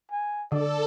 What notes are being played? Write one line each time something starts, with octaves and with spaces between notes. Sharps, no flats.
G#5
D3 A4 D5